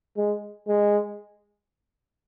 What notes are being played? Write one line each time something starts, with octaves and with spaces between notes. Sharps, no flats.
G#3
G#3